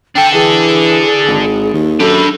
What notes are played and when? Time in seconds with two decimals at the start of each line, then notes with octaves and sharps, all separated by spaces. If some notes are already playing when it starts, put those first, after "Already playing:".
0.16 D4 A4 G5
0.34 E3 G#4
1.27 G#1
1.74 D#2
2.00 F#2 D4 A4 B5